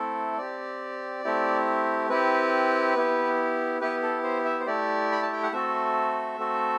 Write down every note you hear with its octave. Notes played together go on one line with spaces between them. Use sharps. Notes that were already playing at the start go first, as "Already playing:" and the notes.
Already playing: A3 C4 E4 A4
C4 G4 D5
A3 C4 E4 G4
C4 E4 G4 B4
B3 E4 G4
B3 E4 G4 B4
A4
C5
E5
C5
A3 E4 G4 D5
B5
A5
G5
F#5
A3 C4 F#4 A4 E5
A3 C4 F#4 A4